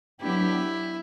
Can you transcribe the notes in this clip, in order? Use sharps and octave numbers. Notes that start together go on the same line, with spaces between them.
F#3 B3 D4 E4 G4